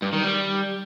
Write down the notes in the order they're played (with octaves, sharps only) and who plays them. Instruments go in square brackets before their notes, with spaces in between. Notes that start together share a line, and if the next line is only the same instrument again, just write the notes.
[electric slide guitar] G2
D#3
G3